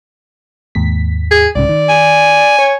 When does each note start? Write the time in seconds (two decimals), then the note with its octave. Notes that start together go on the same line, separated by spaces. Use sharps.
0.75 D#2 G#2 B6
1.31 G#4
1.56 C2 G#2 C#3 D5
1.69 D#3
1.89 G#5
2.58 C#5